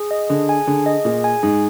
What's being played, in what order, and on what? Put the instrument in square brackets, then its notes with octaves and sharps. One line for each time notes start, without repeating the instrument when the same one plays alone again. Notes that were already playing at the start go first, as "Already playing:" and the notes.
Already playing: [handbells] G#4
D#5
[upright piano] D3 [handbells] G#4
[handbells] G#5
[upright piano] D3 [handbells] G#4
[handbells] D#5
[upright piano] A#2 [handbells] G#4
[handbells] G#5
[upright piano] G#2 [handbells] G#4